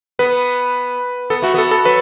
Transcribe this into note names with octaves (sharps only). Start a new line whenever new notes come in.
B3 B4
B3 A4
A3 F#4
B3 A4
A4
F#3 B4